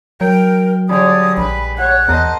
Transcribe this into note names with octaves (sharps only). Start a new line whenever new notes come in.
F#3 A#4 G5
D3 G3 G#3 C#5 D#6
A#1 B4 B5
C#5 F#5 F#6
E2 A#4 C5 D#5 A5